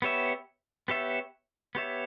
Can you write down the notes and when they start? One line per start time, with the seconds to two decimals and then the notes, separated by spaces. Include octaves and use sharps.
0.02 B3 G4 C#5 E5
0.88 B3 G4 C#5 E5
1.75 B3 G4 C#5 E5